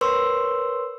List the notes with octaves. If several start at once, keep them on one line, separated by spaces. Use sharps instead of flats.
A#4 B4 C#5 C6 C#6 E6